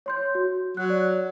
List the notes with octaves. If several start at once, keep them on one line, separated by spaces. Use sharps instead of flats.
C#5 C6 G6
F#4
F#3 F#6
D5